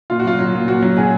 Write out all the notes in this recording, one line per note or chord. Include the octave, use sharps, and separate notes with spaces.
A#2 F4
F#4
F#3 F4
F#3
A#2
A#2 F#4
F#3
F#3 G#4